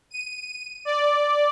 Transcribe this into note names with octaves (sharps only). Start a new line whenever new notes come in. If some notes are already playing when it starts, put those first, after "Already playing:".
D#7
D5